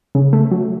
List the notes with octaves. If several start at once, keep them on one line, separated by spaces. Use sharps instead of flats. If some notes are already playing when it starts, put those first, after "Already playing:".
C#3
A3
F#3